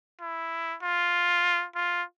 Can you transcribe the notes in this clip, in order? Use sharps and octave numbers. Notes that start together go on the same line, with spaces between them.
E4
F4
F4